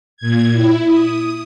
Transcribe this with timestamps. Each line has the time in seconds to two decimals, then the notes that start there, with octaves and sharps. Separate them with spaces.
0.17 A#2 G#6
0.52 E4
0.85 D#6